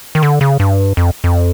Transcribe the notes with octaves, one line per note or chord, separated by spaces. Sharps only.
D#3
D3
C#3
G2
F2
F2